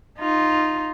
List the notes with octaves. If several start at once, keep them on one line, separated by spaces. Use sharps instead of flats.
D#4 F4